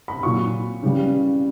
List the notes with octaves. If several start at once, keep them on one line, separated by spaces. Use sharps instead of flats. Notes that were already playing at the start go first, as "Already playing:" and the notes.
B5
A#2 F#3 C#6
C#3 E3 G3